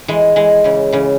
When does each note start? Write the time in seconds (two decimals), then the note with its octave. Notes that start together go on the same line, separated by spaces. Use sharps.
0.08 E3 G#3
0.36 E3 G#3
0.64 C#3 E3
0.93 C#3 E3